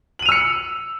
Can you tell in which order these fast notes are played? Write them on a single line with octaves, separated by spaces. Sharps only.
F#7 D#7 F7 E6 C#7